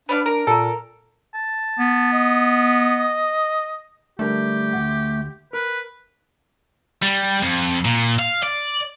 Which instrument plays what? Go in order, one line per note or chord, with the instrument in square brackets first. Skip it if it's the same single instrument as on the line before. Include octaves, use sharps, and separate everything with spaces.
[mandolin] B3 D5 F5 [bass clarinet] D4
[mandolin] A#4
[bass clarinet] A#2 [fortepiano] A4 [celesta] A#5 E6
[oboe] A5
[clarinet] B3
[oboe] D#5
[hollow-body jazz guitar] D3 G3 A#4 [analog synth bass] A3 [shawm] G4
[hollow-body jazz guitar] D2 B2 F#5
[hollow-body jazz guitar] A#4 [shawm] B4
[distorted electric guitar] G3
F2
A#2
F5
D5